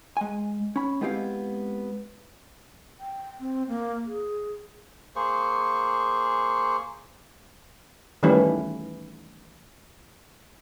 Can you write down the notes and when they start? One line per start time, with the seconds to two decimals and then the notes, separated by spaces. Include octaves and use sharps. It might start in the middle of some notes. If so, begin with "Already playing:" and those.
0.17 G#3 G#5
0.76 C#4 B5
1.01 G#3 B3 C4 E4 G4 F5
3.00 G5
3.40 C4
3.68 A#3
4.06 G#4
5.16 A#3 G#4 C5 C#6
8.23 D#3 E3 G3 A3 C#4 B4